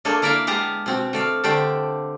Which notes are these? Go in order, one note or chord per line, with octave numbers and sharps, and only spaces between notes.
A3 A#3 D4 G#4 A4
A#3 E4 A#4 D5 E5 F5
G#3 B3 G4 F5 A5 A#5
B2 C4 F#4
A3 D5 F5
D3 A3 D4 G4 C5 D5